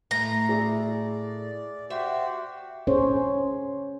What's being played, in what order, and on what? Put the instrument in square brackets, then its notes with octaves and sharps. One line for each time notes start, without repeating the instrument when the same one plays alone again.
[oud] A2 A3 [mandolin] A#5
[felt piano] G#4 E5 [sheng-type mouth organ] D5
[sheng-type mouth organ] F#4 G4 C5 [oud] E5
[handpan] C#4 G#4 C5 C#5